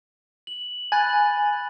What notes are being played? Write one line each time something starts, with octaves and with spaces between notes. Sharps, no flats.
F#7
G#5 B5 F#6 A6